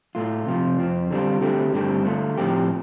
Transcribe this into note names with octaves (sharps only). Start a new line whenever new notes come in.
A2 A3 F4
C3 F3 C4 F4
F2 F3 C4
D3 G3 C4 F4
D3 A3 C4 G4
G2 D3 A3 C4 G4
D3 A3 F4
A2 F3 C4 G4